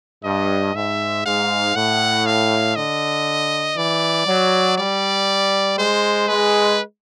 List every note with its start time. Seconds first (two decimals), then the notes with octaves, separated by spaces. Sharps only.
0.24 G2 D#5
0.75 G#2 E5
1.25 G#2 F5
1.76 A2 F#5
2.26 F5
2.76 D3 D#5
3.77 E3 D5
4.27 F#3
4.77 G3 D5
5.78 G#3 C5
6.28 G#3 B4